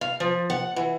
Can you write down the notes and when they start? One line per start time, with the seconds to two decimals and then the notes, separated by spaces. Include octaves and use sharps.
0.01 F5
0.20 F3
0.50 F#5
0.76 E3